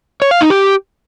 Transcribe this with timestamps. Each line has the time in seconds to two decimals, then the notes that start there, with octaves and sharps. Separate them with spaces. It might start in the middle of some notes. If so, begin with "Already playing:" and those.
0.22 C#5
0.31 F5
0.41 D#4
0.50 G4